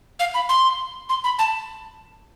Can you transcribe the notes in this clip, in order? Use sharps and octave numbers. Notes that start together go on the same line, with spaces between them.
F5
B5
C6
C6
B5
A5